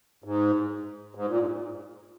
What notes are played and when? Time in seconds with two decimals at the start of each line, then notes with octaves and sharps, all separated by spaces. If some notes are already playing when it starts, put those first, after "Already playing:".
0.24 G#2
1.15 G#2
1.28 A#2
1.39 G#2